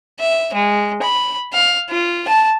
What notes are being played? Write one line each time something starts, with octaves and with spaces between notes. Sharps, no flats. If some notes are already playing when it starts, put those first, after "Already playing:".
E5
G#3
B5
F5
F4
A5